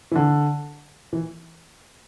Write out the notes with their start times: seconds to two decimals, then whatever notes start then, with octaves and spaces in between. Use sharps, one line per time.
0.12 E3
0.15 D3
1.13 E3